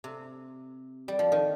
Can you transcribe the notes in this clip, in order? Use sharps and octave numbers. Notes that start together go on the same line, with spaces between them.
C3
G3
F3
D#3